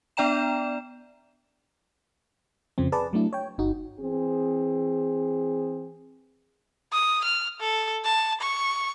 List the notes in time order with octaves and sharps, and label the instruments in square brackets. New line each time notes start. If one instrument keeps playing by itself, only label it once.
[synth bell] B3 D4 D5 G5 A#5 E7
[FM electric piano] F2 C#3 F3 C4
G#4 B4 D5 A5
F#3 A3 D4 E4
C#5 G5
G1 D#4 F#4
[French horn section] E3 C4 G#4
[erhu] D#6
F6
A4
A5
C#6